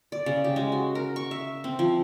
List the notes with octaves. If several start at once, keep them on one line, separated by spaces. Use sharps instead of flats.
D5
C#3
G4
G#3
F#4
A#4
C#6
E5
C4
F3